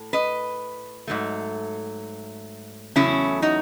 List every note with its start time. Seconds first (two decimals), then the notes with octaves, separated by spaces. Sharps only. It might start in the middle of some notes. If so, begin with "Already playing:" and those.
Already playing: A2
0.13 B4 D#5
1.07 G#2 F#3 A3
2.96 E2 C#3 F#3 A3 C#4 E4
3.42 D#4 F#4